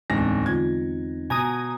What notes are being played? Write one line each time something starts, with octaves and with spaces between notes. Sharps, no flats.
D1 E2 D3 G#3 C4 D#4 A#6
D3 F4 G#6
B2 G#5 A#5 D#6